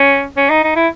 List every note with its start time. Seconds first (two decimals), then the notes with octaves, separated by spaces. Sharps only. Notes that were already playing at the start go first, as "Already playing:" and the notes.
Already playing: C#4
0.37 C#4
0.50 D#4
0.64 D#4
0.76 E4